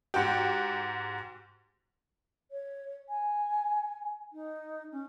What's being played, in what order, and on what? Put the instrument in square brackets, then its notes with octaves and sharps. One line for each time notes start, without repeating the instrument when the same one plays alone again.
[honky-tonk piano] G#2 F#4 G4
[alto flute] C#5
G#5
D#4
C#4